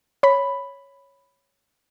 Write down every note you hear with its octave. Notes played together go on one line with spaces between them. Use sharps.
C#5 B5